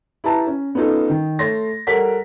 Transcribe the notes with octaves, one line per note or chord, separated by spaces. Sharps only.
E4 G4 B4 A5 A#5
C#4
B3 C#4 D#4 F4 A4
D#3
A3 C#5 C6 A6 A#6
G3 A4 A#4 C#5 F#5 B6